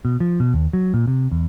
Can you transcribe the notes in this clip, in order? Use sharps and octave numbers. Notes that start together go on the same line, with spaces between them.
B2
F3
B2
D#2
F#3
A#2
C3
E2